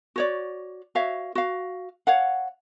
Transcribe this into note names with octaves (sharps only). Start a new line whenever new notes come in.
F#4 C#5 D5
F#4 C#5 E5 F5
F#4 F5
C#5 F5 F#5